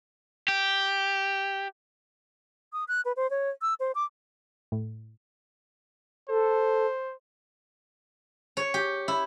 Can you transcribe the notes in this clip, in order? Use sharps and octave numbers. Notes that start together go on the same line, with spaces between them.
G4
D#6
F#6
B4
C5
C#5
E6
C5
D6
A2
A4 C5
C#5
G4
E4